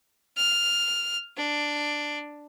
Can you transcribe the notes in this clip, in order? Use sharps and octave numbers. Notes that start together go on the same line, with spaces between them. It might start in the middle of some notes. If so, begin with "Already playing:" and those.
F6
D4